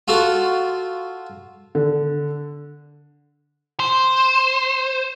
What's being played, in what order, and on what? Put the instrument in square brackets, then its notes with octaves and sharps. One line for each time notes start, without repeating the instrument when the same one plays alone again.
[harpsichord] F4 F#4 A4
[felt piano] D3
[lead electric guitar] C5